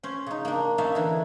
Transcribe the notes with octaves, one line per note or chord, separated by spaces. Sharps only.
C#4 C5
C#3 D#4
A#3 D4
A#3 C#4 D#4 E5 F5 A5
D3 E3